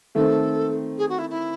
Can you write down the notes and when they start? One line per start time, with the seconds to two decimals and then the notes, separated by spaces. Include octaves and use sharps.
0.15 D#3 A3 C4 A4
0.98 G#4
1.09 F#4
1.19 E4
1.30 E4